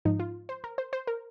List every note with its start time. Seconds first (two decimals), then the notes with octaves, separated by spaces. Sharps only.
0.05 G#2 F3 D#4
0.20 F4
0.49 C5
0.64 A#4
0.78 C5
0.93 C5
1.07 A#4